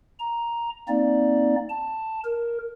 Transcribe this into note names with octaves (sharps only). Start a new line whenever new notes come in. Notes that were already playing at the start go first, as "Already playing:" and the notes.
A#5
A#3 C4 D#4 D5
A5
A#4